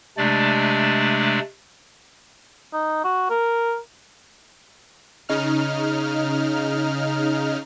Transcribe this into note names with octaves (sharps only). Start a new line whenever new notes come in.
C3 G#3 A3 D4 D5
D#4
F#4
A#4
C#3 D#4 F6